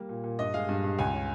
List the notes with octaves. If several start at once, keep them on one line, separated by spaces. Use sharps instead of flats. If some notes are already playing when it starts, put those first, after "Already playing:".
Already playing: G3 A#3
A#2
A#2
G2 D#5
G#3 F5
G2
G2
C#2 G#5
C#3